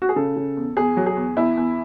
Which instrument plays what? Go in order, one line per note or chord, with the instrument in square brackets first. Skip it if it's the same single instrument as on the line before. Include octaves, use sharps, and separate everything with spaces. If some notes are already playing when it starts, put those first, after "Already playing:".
[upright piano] F#4
G#4
C#3 A4
C#3
E2
E2 G#4
F#3
G#4
E2
E2 E4
E2